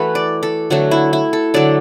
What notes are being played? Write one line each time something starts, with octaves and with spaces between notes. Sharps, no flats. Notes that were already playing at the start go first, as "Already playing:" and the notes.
Already playing: E3 A3 E4 F#4 A4 B4
D5
A4
D3 F#3 A3 F#4
E4
E4
A4
D3 F#3 A3 D5